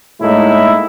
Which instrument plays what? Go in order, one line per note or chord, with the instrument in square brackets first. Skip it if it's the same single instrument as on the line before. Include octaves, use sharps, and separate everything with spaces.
[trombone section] A2 G#3 A#3 D#4 E4